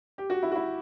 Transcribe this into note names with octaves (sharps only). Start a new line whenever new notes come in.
G4
F#4
E4
F#4
E4